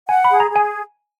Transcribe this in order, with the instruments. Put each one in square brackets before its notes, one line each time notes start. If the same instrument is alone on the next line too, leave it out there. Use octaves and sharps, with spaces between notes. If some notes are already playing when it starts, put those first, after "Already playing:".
[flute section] F#5 [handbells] G#5
[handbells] B5
[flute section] G#4
[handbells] A#5
[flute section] G#4
[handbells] G#5